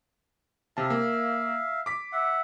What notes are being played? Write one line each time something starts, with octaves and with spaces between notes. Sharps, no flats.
C3 E5 F5 A5
A#3
D6 B6
E5 F#5